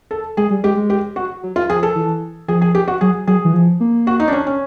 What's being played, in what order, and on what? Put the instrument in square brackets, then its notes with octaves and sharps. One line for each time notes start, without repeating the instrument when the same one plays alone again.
[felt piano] A4
[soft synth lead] G#3 [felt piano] G#4
[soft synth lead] G3
[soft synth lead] G#3 [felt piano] G4
[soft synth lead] G#3
[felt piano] G4
F#4
[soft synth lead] F#3
[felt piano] F4
[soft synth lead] F3 [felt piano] G#4
[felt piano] A4
[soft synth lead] E3
[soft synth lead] F3 [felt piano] G#4
[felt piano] G#4
G4
F#4
[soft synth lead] F#3 [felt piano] G#4
[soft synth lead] F#3 [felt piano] G#4
[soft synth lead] E3
F3
A#3
[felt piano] F#4
D#4
D4
C#4
C#4